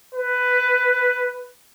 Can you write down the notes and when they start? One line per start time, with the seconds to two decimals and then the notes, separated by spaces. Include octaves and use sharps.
0.14 B4